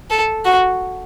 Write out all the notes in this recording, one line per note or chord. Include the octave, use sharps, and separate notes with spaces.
A4
F#4